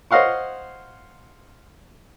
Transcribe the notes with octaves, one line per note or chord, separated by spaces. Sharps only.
C5 C#5 D#5 F5 F#5 C#6